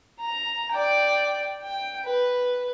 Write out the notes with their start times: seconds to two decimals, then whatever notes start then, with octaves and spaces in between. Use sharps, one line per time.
0.19 A#5
0.72 D5 G5
1.63 G5
2.05 B4